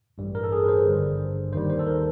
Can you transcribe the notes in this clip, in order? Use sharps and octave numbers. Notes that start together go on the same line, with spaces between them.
A1 G2 E3 G3
A#4
A4
G#4
B4
C5
G#1 G2 D3 G3
D#2 D#3 G3 C5
C5
A4
A#4